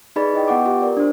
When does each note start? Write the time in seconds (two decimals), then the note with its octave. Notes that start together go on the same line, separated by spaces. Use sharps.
0.16 D#4 G#4 B4 D5 B5 A6
0.33 E4 D#5 G5
0.48 B3 B4 F#5 G5 C#6 D6
0.65 F4 G4
0.82 A#4 D5
0.97 D4 C5